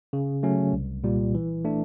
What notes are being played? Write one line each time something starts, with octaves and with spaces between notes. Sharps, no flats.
C#3
F#3 A3 C#4
C2
A#2 G3
E3
A3 D4